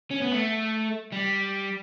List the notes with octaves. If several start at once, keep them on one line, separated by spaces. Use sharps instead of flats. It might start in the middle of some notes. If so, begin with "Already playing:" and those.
C#4
B3
A3
G3